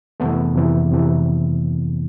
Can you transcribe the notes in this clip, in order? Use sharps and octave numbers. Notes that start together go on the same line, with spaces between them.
F2 C3 E3 A3 B3
F2 C3 E3
F2 C3 E3